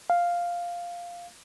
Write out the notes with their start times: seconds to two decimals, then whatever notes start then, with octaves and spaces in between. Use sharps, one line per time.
0.10 F5